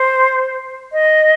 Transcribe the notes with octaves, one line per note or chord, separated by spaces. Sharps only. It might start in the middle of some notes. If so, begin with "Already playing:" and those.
Already playing: C5
D#5